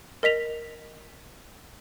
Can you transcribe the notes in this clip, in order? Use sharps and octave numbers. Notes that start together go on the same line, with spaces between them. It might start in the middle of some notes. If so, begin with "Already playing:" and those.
A#4 D#5 B6 F7